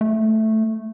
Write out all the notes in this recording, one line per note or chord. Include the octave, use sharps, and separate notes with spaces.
A3